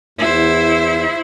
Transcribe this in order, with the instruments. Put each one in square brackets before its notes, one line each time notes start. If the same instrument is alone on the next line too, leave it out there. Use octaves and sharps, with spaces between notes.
[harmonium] E2 [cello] E4 C5